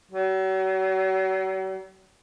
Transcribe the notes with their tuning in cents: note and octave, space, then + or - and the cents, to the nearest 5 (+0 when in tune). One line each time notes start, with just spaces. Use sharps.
F#3 +40